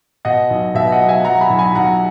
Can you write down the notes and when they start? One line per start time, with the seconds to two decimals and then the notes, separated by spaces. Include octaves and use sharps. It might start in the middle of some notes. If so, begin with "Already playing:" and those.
0.25 B2 D#5 F#5
0.50 B1
0.74 B2 E5
0.92 D#5 F#5
1.00 F#3
1.09 E5 G#5
1.25 F#3 F#5 A#5
1.41 G#5 B5
1.50 B1
1.59 G#5 B5
1.75 B1 F#5 A#5